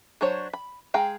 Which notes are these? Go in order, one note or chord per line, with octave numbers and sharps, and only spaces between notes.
F#3 D4 F#4 C5 C#5
B5
G#3 G#4 F5 G5 A#5